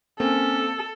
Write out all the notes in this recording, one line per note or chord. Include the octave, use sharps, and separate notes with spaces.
A#3 C4 C#4 A4